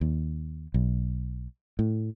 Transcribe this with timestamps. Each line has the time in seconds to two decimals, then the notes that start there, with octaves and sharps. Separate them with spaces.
0.01 D#2
0.74 B1
1.79 A2